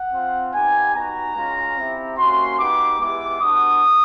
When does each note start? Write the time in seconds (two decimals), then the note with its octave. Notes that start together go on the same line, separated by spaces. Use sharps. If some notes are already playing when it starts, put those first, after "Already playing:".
Already playing: F#5
0.13 C4 F4
0.53 B3 D#4 G4 G#5
0.94 B3 D#4 F#4 A#5
1.35 G#3 C#4 F4
1.77 C4 E4 G4
2.17 A#3 C#4 F#4 C6
2.58 B3 D#4 G4 D6
2.99 G#3 B3 E4 G4 D6
3.41 B3 D4 F#4 D#6